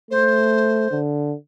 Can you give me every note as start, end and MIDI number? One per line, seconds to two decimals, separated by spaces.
0.11 0.89 57
0.11 0.98 72
0.91 1.35 50